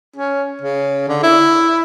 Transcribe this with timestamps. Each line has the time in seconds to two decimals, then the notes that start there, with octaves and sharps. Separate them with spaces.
0.16 C#4
0.61 C#3
1.08 D3
1.23 E4